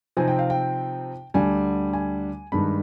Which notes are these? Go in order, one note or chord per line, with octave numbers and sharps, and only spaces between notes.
C3 F3 C4 D#4 G#5
G5
F5
G5
D2 D3 G3 D4 G#5
G#5
G2 D#3 G#3 D4 B5